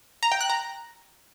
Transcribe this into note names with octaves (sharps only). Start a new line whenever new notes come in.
A#5
G5
F#6
A#5